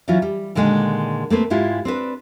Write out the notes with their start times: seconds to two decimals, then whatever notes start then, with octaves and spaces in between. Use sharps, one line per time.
0.08 E3 F#3 C#4 E4 F4
0.22 G3
0.55 A#2 D3 D#3 G#3 G#4 D#5
1.30 A3 A#3 C4 B4
1.50 G#2 G#3 E4 F4 G4
1.85 C4 D4 B4